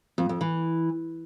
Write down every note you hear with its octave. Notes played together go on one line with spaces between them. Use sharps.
F2
F2
E3